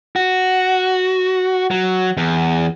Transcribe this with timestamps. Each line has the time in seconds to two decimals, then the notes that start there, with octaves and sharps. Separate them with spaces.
0.16 F#4
1.71 F#3
2.17 E2